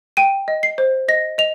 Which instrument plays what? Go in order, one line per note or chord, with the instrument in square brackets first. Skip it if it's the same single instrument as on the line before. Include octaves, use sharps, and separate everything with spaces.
[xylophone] G5 D#7
D#5
C7
C5
D#5 A#6
D#5 F7